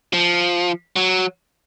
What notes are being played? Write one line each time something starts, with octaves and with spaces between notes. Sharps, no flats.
F3
F#3